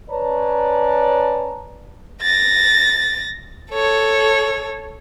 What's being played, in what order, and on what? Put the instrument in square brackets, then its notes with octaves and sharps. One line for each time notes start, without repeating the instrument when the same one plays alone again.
[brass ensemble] C#4 B4 C#5 D5 A5 A#5
[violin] A6 A#6
A4 C#5